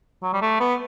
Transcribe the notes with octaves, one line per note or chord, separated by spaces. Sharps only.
F#3
G3
A3
B3